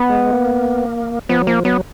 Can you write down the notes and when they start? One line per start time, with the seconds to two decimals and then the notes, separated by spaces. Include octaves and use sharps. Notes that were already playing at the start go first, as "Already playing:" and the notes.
Already playing: B3
0.10 G#3
0.33 A#3
1.29 F3 B3
1.41 F#3
1.47 F3 A#3
1.65 F#3 B3